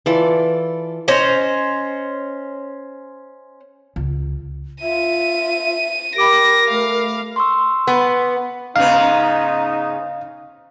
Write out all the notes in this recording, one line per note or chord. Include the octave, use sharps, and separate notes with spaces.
E3 F4 A4 D5
C#4 C5 D#5
C#2
F4 E5 D#7
G4 A#4 B5 D6 A#6 D7
A3 F5
C6 C#6 E6
B3
G#2 C#3 B3 D#4 F5